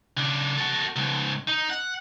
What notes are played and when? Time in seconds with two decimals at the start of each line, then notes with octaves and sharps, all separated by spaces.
0.17 C#3 D4
0.57 F#4 A4
0.96 C#2 G#2
1.48 D#4
1.70 F#5